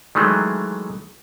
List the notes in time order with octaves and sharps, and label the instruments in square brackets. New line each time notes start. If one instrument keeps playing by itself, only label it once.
[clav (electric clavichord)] D#3 E3 F#3 G#3 A3